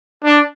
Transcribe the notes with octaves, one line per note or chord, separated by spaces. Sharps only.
D4